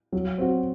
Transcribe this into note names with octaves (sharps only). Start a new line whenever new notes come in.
F#3
C4 F#4